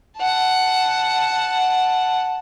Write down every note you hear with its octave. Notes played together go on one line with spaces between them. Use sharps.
F#5 A5